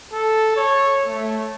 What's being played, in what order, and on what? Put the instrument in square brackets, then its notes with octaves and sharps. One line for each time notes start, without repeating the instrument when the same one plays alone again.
[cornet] A4
C#5
A3